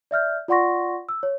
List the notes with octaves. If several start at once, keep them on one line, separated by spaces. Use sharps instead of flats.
D5 E5 F6 G6
F4 D5 F#5 C6 C#6 A#6
E6
C#5